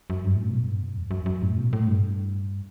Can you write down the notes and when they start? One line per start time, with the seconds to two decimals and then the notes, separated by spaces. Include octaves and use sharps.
0.10 F#2
0.23 G2
0.36 A2
0.50 B2
0.65 G2
0.81 F#2
0.96 E2
1.11 F#2
1.26 F#2
1.42 A2
1.58 B2
1.73 A2
1.87 G2